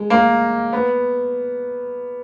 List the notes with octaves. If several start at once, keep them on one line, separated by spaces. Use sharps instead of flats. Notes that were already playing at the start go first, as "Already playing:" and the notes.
Already playing: G#3
A#3
B3